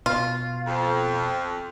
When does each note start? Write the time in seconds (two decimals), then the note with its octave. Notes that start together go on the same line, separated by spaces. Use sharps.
0.06 B2 F4
0.66 F2